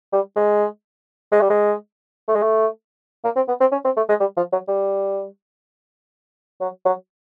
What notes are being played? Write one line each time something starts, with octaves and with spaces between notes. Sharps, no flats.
G3
G#3
G#3
G3
G#3
A3
G#3
A3
A#3
C4
B3
C4
C#4
C4
A3
G#3
G3
F3
F#3
G3
F#3
F#3